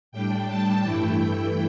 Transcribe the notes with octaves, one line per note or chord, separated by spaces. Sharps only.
A2 G3 D4 G5
A5
G2 E3 A3 E4 G5